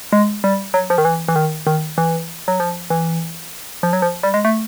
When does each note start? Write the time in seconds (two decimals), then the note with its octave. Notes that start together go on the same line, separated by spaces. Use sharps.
0.13 G#3
0.44 G3
0.74 F#3
0.90 F3
0.98 D#3
1.05 E3
1.28 E3
1.36 D#3
1.67 D#3
1.98 E3
2.48 F#3
2.60 F3
2.90 E3
3.83 F3
3.93 F#3
4.02 F3
4.23 G3
4.34 G#3
4.45 A3